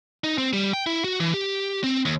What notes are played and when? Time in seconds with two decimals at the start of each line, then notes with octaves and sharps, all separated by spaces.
0.24 D#4
0.38 C4
0.53 G3
0.73 G5
0.86 E4
1.04 F#4
1.20 E3
1.34 G4
1.84 C4
2.05 D#2